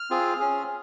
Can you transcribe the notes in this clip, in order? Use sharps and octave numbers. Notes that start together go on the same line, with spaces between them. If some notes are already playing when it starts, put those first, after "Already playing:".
Already playing: F6
C4 F4 G#4
C#4 G#4